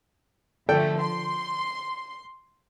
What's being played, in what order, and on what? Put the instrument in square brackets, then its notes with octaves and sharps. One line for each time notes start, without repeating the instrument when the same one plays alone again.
[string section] D3 F3 A3 [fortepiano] A4 D5 G5
[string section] C6